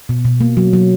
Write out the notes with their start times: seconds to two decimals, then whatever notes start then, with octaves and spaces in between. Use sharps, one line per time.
0.09 B2
0.25 B2
0.41 A#3
0.57 F#3
0.73 F#3